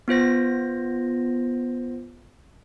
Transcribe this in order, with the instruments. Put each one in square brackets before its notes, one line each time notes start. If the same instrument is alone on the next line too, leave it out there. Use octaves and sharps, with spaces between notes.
[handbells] B3 F4 C5 A#6